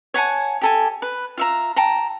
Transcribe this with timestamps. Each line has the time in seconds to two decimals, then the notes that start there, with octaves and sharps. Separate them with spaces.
0.14 C#5 F#5 G#5 A5
0.61 G4 A4 G#5
1.02 B4
1.37 F4 E5 A#5
1.76 G5 A5 A#5